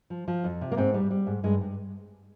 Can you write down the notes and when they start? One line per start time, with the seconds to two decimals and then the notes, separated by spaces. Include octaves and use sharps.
0.10 F3
0.28 F3
0.44 F2
0.61 C3
0.72 A#3
0.77 G#2 C4
0.94 G3
1.11 G3
1.27 G#2
1.43 G2 G#3
1.61 G2